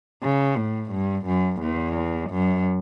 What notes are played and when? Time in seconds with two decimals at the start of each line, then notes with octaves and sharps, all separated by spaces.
0.23 C#3
0.57 A2
0.92 G2
1.26 F#2
1.61 E2
2.30 F#2